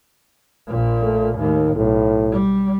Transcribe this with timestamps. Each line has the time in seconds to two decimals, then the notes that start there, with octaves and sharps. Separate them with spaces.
0.67 A#1 A#2
1.02 A3
1.37 D#2 A2 D#3
1.76 B1 A2
2.32 G3